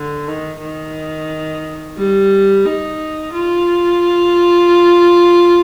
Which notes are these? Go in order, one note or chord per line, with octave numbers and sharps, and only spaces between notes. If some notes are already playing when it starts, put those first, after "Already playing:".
Already playing: D3
D#3
D#3
G3
D#4
F4